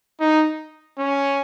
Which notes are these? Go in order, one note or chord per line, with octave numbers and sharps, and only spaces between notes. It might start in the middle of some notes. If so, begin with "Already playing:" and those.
D#4
C#4